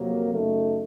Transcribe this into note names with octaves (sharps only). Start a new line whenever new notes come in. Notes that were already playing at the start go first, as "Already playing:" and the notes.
Already playing: F2 C3 F#3 A#3
F#2 C#3 A3 D#4